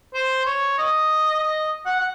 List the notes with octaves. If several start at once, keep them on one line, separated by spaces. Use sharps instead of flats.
C5
C#5
D#5
D#5
F#5
F#5